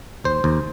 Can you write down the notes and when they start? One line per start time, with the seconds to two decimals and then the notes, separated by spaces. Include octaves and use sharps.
0.24 D#2 C5
0.44 D#2